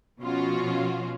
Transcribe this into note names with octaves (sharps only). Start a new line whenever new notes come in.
B2 F3 C#4 F4 F#4